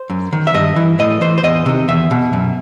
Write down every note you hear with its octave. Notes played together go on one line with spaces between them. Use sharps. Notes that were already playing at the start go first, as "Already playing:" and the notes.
Already playing: C5
F#2
D#3
E5
G2 D#5
E3
A2 D#5
E3 C5
C5
E2 D#5
C3 D#3
E2 E5
B2
F#2